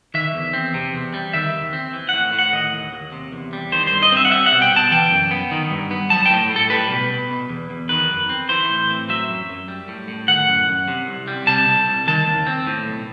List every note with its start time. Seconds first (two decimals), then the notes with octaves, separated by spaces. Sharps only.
0.14 D#3 E5
0.35 E2
0.53 C4
0.74 C3
0.93 E2
1.14 G3
1.33 D#3 E5
1.54 D#2
1.73 C4
1.93 E3
2.09 A2 F#5
2.33 A2
2.39 F#5
2.53 D#3 D#5
2.73 D#2
2.93 D#2
3.12 C3
3.32 E2
3.53 G3
3.72 D#3 C5
3.87 C5
3.92 G2
4.03 D#5
4.12 C4 E5
4.25 F#5
4.31 G3 E5
4.46 F#5
4.52 B2
4.62 G5
4.72 B2 A5
4.91 E3 G5
5.11 F#2
5.31 B3
5.51 D#3
5.71 G2
5.91 B3
6.10 F#3 A5
6.26 A2 G5
6.50 A2
6.56 A4
6.70 G3 B4
6.90 B2
7.11 B2
7.30 B2
7.49 E2
7.70 E2
7.89 D#3 B4
8.10 F#2
8.29 C4
8.49 E3 C5
8.70 A2
8.90 C4
9.09 F#3 E5
9.28 F#2
9.49 F#2
9.68 G3
9.88 A2
10.08 A2
10.28 D#3 F#5
10.49 F#2
10.68 F#2
10.88 C3
11.07 C2
11.28 G3
11.47 C3 A5
11.68 C2
11.88 C2
12.07 D#3 A5
12.27 D#2
12.47 C4
12.67 A2
12.87 B1